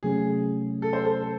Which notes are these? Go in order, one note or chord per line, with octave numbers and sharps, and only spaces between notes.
C3 F#3 A3 C#4 G#4
A4
C5
A4
A4